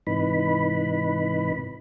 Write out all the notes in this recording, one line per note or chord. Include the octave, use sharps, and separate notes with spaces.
G#2 C3 E3 D#4 B4 B5